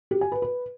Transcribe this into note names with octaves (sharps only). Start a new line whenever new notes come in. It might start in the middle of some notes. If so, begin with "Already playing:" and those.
G4
G#5
B4
B4